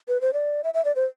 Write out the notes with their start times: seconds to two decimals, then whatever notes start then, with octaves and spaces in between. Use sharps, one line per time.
0.08 B4
0.21 C5
0.33 D5
0.64 E5
0.74 E5
0.85 D5
0.96 C5